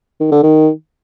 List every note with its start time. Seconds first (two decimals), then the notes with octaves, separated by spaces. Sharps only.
0.20 D#3
0.32 D3
0.43 D#3